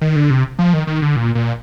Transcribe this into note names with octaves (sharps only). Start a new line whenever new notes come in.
D#3
D3
C3
F3
D#3
D#3
D3
A#2
A#2